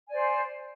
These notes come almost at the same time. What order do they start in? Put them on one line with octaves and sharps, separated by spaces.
G#5 D5 C5